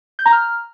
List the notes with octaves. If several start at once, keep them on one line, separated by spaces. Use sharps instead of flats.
G6
A#5
F6